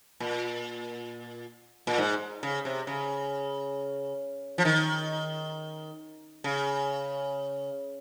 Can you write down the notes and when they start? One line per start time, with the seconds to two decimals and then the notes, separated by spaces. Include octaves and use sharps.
0.20 A#2
1.87 A#2
1.98 G#2
2.43 C#3
2.65 C3
2.87 C#3
4.58 F3
4.65 D#3
6.44 C#3